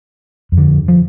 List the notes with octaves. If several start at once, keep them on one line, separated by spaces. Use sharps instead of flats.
F2
D3
F3